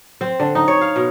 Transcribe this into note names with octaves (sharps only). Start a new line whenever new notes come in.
C4
D3
D#4
C#5
F5
B2